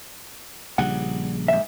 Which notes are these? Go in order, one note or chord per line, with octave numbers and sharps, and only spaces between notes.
A#1 C#3 G3 F#5
G#2 E5